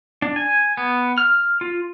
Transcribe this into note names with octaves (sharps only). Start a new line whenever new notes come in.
D4
G#5
B3
F6
F4